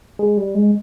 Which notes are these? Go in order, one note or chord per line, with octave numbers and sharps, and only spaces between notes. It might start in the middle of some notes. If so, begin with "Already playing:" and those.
G#3
G3
G#3